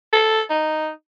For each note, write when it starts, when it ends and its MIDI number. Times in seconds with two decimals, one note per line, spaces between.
0.13 0.42 69
0.50 0.90 63